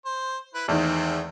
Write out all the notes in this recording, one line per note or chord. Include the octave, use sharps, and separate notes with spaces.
C5
E4 B4
E2 D#3 G#3 A3 C4